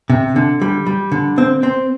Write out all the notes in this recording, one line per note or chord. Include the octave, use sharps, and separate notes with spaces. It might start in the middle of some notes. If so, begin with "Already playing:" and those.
C3
D3
G3
G3
D3
C4
C4